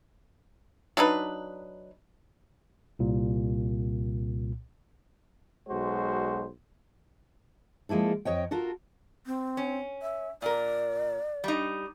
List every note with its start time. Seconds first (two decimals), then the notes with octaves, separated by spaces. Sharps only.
0.97 F#3 D4 D#4 B4
2.99 C2 A#2
5.68 B1 G#3 F#4 C5
7.89 F3 G#3 A#3 E4 A4
8.25 F2 C#5 D#5 G5
8.51 F4 F#4 A4 A#4
9.26 C4
9.57 C#4
10.02 E5
10.42 A#2 A#4 D5
11.44 G3 D#4